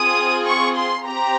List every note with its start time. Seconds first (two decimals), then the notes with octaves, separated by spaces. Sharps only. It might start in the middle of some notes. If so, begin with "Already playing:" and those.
Already playing: C4 F4 G#4 D#6
0.47 C#6
0.76 C6
1.06 C4 G4 A#5